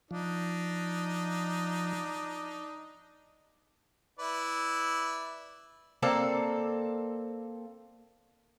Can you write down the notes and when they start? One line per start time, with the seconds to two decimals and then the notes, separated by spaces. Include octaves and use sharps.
0.11 F3 D4 D#4
4.19 E4 B4 D5
6.03 A#3 C4 A4 D5